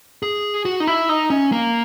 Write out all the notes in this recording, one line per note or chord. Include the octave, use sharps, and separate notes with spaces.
G#4
F#4
D#4
E4
D#4
C#4
A#3